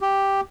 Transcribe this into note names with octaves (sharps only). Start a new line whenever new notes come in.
G4